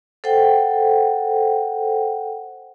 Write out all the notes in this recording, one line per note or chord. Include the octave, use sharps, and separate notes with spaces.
A4 C5 F#5 G5